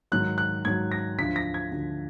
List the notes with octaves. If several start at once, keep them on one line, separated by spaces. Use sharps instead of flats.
G#2 D#3 F#3 F#6
F#6
G#2 D#3 F#3 G#6
A#6
D2 D3 F3 B6
A#6
G#6
D2 D3 F3